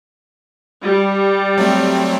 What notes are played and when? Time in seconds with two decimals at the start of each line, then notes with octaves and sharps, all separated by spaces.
0.83 G3
1.58 F#3 A3 C4